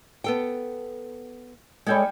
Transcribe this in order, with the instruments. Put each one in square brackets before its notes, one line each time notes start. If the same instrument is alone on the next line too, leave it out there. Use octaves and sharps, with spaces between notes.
[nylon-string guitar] B3 A4 G5
[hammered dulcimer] G3 G5 G#5 [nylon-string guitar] G#3 A4 C#5